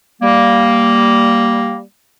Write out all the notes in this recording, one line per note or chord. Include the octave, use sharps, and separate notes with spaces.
G3 A#3